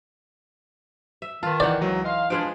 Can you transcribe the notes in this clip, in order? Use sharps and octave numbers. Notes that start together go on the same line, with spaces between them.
E5
D#3 F4 B4 A5
E3 D#4 D5 F#5 G5
C#2 F#3
D#5 F5 C6
F3 G#3 D4 G#4 B4 F6 D7